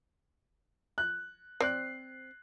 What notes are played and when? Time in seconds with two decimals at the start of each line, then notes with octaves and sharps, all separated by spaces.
0.98 F#6
1.61 C4 D5 F#6 C7